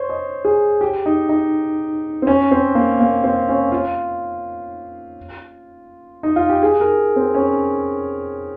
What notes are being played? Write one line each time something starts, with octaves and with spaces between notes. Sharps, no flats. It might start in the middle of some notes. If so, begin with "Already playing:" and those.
Already playing: C5 C#5
D#5
G#4
G4
D#4
D#4
C4
C#4
C4
A#3
A#3
C4
C#4
F4
D#4
F4
G4
G#4
A#4
C4
C#4